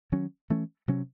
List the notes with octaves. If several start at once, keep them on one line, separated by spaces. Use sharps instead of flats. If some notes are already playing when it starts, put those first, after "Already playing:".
D#3 F#3 C#4
E3 A3 C#4
C3 F#3 C#4